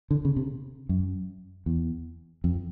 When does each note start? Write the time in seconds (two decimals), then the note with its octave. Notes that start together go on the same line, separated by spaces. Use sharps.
0.11 D3
0.25 C#3
0.36 C3
0.89 F#2
1.66 E2
2.44 F2